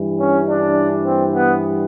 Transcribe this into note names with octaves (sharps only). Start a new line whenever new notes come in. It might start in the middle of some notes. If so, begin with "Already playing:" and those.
Already playing: G2 E3 G3
C#4
D4
C4
B3